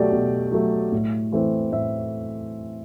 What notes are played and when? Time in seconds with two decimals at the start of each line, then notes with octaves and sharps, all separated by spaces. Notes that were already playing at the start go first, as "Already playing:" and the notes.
Already playing: B2 F#3 A3 G4 D5
0.12 B2
0.52 F#3 A3
0.92 A2
1.32 E3 A3 C4
1.72 A2 E5